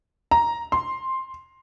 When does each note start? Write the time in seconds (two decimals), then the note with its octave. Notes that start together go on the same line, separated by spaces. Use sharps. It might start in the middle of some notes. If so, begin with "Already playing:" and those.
0.31 A#5
0.72 C6